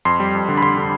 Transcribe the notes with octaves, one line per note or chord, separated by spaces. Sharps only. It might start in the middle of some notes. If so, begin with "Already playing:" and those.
F2 C6
G3
F2
D3
B5
D3 C6
D3